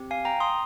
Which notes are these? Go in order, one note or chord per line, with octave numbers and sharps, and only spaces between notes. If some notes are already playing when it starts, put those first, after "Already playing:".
Already playing: C4 G4
F5 G#5
G5 A#5
C6 D#6